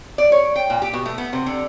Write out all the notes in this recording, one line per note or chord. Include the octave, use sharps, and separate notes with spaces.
D5
C#5
G5
A#2
G4
B2
A3
B3
C3
D3